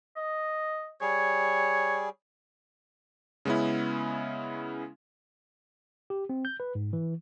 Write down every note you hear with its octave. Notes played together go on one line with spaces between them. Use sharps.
D#5
G3 G#4 C#5
C#3 G#3 B3 C#4 E4
G4
C4
G6
B4
G#2
E3